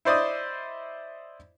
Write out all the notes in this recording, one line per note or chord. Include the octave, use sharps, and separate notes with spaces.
E4 C5 D5 D#5 D#6